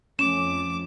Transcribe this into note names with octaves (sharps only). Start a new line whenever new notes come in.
F2 F3 A3 C#4 D6 E7